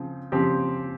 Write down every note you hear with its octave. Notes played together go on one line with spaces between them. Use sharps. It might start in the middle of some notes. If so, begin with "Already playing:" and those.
Already playing: C#3 F3 C4
C#3 F3 C4 G4